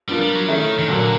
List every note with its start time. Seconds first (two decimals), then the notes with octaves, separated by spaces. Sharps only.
0.09 G3 B3 D4 F4 A#4
0.21 G3
0.35 F#3
0.48 D#3 A3 C#4 E4
0.79 D#3
0.88 A#2 D3 F#3 A#3